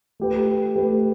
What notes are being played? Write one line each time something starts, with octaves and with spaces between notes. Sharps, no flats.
A3 G4 B4
A3 G4 B4